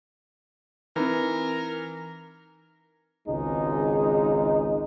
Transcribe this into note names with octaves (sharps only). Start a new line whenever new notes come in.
E3 C4 D#4 A#4 B4
G#1 C#2 G#3 D#4